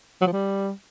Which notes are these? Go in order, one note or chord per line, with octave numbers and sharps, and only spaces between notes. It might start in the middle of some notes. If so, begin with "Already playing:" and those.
F#3
F3
G3